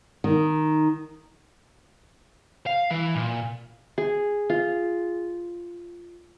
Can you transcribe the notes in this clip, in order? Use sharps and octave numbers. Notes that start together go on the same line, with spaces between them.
D#3
F5
E3
A#2
G#4
F4